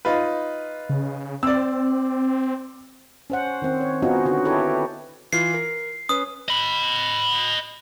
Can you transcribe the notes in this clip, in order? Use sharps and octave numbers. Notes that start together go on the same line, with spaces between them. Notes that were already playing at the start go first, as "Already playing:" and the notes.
D#4 F4 B4
C#3
C4 D5 E6
C#4 C5 F#5
D#3 C4
C#5
B3 C#4 D#4 F4 F#4
D3 F#4
E4 G4 A4 B4 C#5
E3 F4 F6 C7
A#4
C#4 B4 D#6
D#5 B5